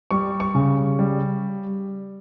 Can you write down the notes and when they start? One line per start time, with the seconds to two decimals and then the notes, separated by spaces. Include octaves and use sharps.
0.11 G3 C#6
0.40 C#6
0.55 C#3
0.99 G3